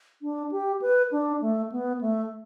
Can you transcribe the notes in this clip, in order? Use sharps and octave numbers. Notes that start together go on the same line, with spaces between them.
D4
G4
B4
D4
A3
B3
A3